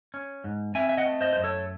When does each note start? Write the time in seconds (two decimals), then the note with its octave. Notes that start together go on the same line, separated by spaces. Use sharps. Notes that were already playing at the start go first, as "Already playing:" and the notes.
0.14 C#4
0.44 G#2
0.75 C4 E5 G#5
0.89 E5
0.97 D#5 F#5
1.06 A3
1.21 C5 D#5
1.33 F#2 C5
1.44 A4 C#5